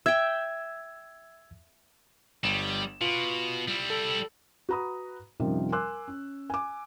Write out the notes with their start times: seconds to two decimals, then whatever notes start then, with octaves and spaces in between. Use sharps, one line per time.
0.06 E5 G5 E6 G#6
2.44 G1 G3 E7
3.01 B2 F4
3.68 G3 E4
3.90 A4
4.69 F#4 B4 A#5 B5 D#6
5.40 F#2 C3 D#3 F3 G3
5.72 A#4 G#5 C6 D6 E6 F#6
6.08 C#4
6.50 G#5 D6